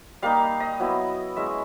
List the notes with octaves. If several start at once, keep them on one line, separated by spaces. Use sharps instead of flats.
G3 A#3 D#4 F5
D#5
F#3 B3 E4
G#3 C#4 E4 E5